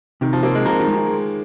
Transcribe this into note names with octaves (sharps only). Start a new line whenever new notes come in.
C3 D#3
F3
A#3 C4
G#3
F3 A#4
D#3
G#3
D#3
G#3